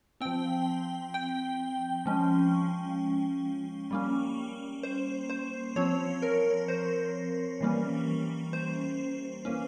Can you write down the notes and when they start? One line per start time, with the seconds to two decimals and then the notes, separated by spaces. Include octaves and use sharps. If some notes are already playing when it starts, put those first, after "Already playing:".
0.21 F3 C4 G5
1.14 G5
2.06 F3 G#3 C#4
3.91 G3 A#3 C#4
4.83 C5
5.30 C5
5.76 F3 C4 C#5
6.22 A#4
6.68 C5
7.61 E3 G3 A#3 C#4
8.53 C5
9.45 E3 A#3 C#4